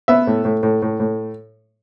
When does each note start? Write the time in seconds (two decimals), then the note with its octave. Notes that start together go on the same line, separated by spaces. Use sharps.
0.08 B3 E5
0.27 A2
0.45 A2
0.63 A2
0.82 A2
1.00 A2